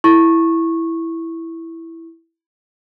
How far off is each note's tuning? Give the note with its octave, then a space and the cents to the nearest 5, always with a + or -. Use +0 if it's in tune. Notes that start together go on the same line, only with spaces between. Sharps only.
E4 +0 C#6 -15